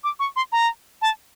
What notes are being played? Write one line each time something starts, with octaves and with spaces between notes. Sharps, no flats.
D6
C#6
C6
A#5
A5